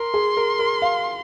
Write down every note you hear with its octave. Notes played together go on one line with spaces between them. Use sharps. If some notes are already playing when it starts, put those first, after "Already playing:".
Already playing: A#4 C6
G#4
A#4
A#4
F5